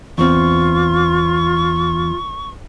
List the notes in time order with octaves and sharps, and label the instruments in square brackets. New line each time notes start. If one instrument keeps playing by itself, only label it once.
[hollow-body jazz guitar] E2 C4 [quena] F4 [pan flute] C#6